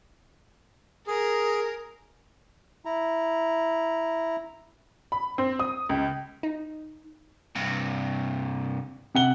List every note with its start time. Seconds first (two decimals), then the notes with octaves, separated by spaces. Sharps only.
1.07 G#4 A#4
2.85 E4 A#5
5.12 B5
5.38 C4
5.60 D#6
5.89 C#2
6.43 D#4
7.55 G2 C3
9.15 C3 F#5 G7